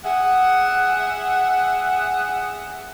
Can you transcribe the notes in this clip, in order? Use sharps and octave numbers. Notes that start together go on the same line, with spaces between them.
G#4 E5 F#5